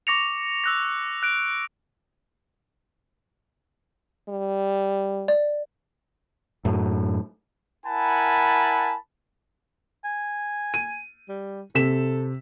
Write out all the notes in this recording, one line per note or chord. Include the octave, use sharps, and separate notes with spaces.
C#6 D6 A#6 C#7 F7
E6 F#6 A#6
F#6 D7
G3
D5
F#2 A2
E4 A#4 F#5 G#5 A5 B5
G#5
D#7
G3
C3 A4 B6 E7